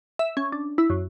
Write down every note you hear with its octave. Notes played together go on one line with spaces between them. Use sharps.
E5
C#4
D4
E4
F#2